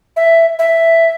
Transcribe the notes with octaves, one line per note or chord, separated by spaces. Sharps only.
E5
E5